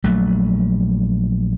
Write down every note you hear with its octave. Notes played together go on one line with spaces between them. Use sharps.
A#1 F#3 A3